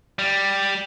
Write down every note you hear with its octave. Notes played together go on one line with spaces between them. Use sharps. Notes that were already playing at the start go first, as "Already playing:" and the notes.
G3